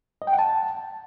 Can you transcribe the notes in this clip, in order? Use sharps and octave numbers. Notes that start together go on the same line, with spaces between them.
D#5
G5
F#5
A5